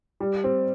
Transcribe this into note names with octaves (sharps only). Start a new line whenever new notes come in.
G3
C4